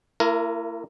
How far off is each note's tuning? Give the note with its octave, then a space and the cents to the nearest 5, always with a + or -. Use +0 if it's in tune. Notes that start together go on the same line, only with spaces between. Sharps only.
A#3 -45 E4 +30 A#4 +0